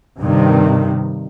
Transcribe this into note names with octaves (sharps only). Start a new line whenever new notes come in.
G2 C3 D#3